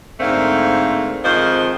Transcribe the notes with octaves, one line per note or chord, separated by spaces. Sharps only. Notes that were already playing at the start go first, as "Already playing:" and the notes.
G#2 D3 A3 A#3 C4
F2 D#3 F3 G#3 C5